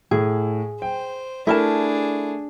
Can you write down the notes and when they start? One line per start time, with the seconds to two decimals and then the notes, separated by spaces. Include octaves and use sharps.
0.11 A2 G#4
0.82 C5 G5
1.47 A3 D4 E4 G#4 A#4 A5